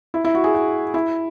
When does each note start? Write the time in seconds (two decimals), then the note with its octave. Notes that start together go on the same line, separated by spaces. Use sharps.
0.14 E4
0.25 E4
0.35 F#4
0.44 G#4
0.54 F#4
0.94 E4